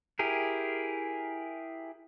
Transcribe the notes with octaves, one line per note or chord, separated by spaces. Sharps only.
E4 G4 G#4 A#4